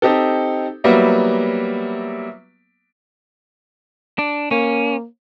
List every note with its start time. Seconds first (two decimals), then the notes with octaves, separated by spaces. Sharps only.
0.02 C4 D#4 G4 A4
0.84 F#3 G3 A#3 B3 E4
4.19 D4
4.51 A#3 C#4